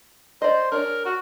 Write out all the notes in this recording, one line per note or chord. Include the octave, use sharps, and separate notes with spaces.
C5 D5 D#5
D4 G#4 A#4 C#5
F#4